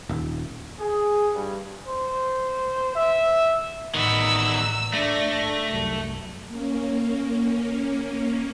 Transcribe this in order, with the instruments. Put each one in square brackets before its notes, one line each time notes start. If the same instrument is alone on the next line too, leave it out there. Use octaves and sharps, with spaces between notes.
[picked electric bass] D#1
[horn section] G#4
G2
[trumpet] C5
E5
[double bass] A1 [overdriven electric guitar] D#3 B3 [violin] A#5 E6
[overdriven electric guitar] A3 [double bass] D4 [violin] A#6
[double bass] C2 F#2
[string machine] A#3 C#4